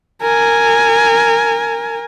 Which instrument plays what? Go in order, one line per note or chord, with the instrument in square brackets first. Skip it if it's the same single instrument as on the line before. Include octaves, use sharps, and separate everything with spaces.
[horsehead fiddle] A#4 G#5